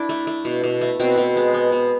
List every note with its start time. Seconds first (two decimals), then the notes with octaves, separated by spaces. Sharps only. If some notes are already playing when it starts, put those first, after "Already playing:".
Already playing: D4 E4
0.09 A3
0.27 A3
0.45 B2
0.64 B2
0.81 A3
1.00 B2 C4
1.18 B2
1.36 G#3
1.54 B3
1.72 B2